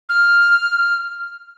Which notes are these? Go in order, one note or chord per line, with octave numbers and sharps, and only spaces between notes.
F6